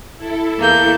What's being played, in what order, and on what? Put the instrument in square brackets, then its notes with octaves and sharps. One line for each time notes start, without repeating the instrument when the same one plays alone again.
[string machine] E4 A4
[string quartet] E2 A#3 G6